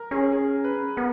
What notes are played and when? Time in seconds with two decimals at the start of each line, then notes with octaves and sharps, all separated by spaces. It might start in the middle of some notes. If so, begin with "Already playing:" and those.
Already playing: A#4
0.11 C#4 G#4
0.32 G#4
0.64 B4
0.96 B3 A#4